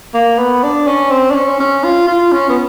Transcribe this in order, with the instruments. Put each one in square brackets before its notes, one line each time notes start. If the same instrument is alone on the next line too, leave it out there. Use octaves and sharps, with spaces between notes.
[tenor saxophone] A#3
B3
D4
C#4
C4
D4
C#4
C#4
F4
F4
C#4
B3